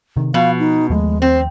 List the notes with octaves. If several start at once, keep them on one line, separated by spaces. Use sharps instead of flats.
C3 D#3
B2 F3 F5
D#4
D#2 F3 G#3 A3
C4 C5